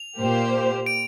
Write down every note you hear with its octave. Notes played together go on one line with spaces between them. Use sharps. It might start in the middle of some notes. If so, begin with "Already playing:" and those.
Already playing: F7
A#2 A#3 G4 C5
D7